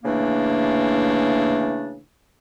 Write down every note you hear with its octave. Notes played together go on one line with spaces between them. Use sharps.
C#3 E3 A3 A#3 D4